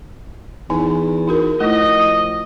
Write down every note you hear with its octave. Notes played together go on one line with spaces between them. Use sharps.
E2 D#4 G#5
D#4 F#4 A#4
F3 A3 E4 D#5